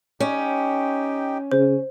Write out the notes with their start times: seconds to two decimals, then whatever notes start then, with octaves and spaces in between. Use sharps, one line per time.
0.20 C#4 D#4 G4 G5
1.52 C#3 C5